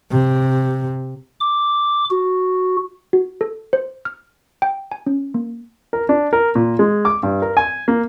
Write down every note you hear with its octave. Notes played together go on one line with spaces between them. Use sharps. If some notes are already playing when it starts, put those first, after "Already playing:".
C3
D6
F#4
F#4
A4
C5
F6
G5
G#5
C#4
A#3
A#4
D4
A#4
A#2
G#3
D6
G2
A#4
G#5
A#3